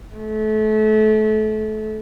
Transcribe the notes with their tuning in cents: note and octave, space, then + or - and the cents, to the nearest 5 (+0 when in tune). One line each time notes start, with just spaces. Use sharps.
A3 -30